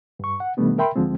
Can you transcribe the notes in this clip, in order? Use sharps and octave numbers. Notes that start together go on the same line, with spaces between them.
G2 C#6
F#5
B2 D#3 G3 A3 B3 D4
A#4 E5 G5 B5 C6
D2 D3 F3 G#3 C4